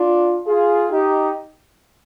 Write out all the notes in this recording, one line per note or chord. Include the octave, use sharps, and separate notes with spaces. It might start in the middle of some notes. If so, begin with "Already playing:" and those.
Already playing: D4 F4
F4 G#4
D#4 G4